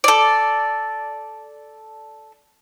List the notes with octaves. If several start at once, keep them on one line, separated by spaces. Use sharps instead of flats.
A4 D5